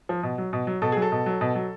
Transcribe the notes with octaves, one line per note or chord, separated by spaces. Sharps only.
F3
B2
F#3
B2
F#3
B2 A4
F#3 G#4
A4
B2
F#3
B2
F#3